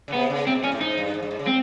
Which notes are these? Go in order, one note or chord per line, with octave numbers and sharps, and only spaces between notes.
C#3
C3 B3
C#3
C3 C4
B2
A#2 C#4
A2
G#2 D#4
G2
G#2
G2
G#2
C#3
C4